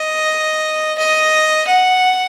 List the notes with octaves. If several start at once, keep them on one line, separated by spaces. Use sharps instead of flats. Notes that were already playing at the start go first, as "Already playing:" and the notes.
Already playing: D#5
D#5
F#5